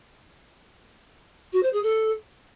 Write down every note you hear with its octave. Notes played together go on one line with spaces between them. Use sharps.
F#4
C5
G#4
A4